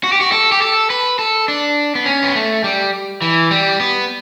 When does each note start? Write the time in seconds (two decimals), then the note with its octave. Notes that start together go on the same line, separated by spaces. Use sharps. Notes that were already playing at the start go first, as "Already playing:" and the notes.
0.04 F#4
0.12 G4
0.21 F#4
0.32 A4
0.52 G4
0.62 A4
0.90 B4
1.19 A4
1.48 D4
1.95 B3
2.06 C#4
2.23 B3
2.35 A3
2.64 G3
3.22 E3
3.51 G3
3.80 B3